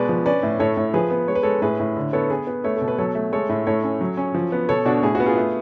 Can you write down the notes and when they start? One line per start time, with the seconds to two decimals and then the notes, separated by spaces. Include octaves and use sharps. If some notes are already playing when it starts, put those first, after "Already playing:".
Already playing: B2 G#3 B4 D5
0.09 F3
0.26 C#4 B4 D5
0.43 A2
0.59 A2 A4 C#5
0.77 A2
0.94 F3 G#4 B4
1.11 B3
1.28 G#3 C#5
1.35 B4
1.43 G#3 A4 C#5
1.62 A2 G#4 B4
1.79 A2
1.96 D3
2.13 B3 A4 C#5
2.30 B3 G#4 B4
2.47 B3
2.64 A3 A4 C#5
2.76 B2 A4
2.88 B4
2.98 F#3 A4 C#5
3.15 A3
3.33 G#3 A4 C#5
3.49 A2
3.67 A2 A4 C#5
3.84 C#4
4.01 F#3
4.17 C#4
4.34 F3
4.52 B3
4.69 B2 A4 C#5
4.85 B2 D4 F#4
5.03 A2 G#4
5.15 F#4
5.20 B3
5.26 F4 G#4
5.37 A3